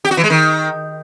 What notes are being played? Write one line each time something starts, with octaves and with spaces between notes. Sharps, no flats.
G4
F#4
E3
G#3
D#3